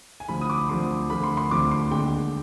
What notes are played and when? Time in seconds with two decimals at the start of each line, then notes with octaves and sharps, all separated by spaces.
0.20 G#5
0.28 D2 D3 F3 B5
0.41 D#6
0.50 D6
0.69 D2 D3 F3 C6
1.10 D2 D3 F3 B5
1.24 C6
1.37 C6
1.51 D2 D3 F3 D6
1.71 C6
1.91 D#2 D3 G#3 D4 G5